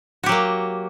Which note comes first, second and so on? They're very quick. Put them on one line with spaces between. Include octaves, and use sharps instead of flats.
F#4 G4 F#3 A#3